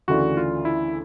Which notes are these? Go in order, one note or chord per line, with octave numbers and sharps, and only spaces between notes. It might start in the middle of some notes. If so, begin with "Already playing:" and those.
D2 C#3 E3 A3 D4 F#4
F4
E4